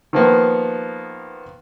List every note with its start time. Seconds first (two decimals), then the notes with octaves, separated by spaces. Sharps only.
0.13 D#3 F3 A#3 B3